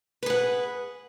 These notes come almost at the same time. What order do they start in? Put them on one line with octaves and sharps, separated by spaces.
B4 G#4 F#5